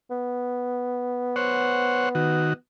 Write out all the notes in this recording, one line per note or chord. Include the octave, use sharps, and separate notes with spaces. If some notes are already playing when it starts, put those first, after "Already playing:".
B3
C5 C#5 F#5
D#3 F#4